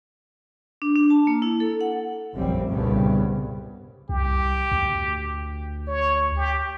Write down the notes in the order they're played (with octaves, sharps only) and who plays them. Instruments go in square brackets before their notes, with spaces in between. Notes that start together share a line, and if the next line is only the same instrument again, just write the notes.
[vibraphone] D4
D4
A5
A#3
E4
A4
F#5
[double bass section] F1 A#1 F#2 G3 C4
C2 G2 A#2 C#3 B3
[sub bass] C2 [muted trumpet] G4
[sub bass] D2
[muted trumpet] C#5
G4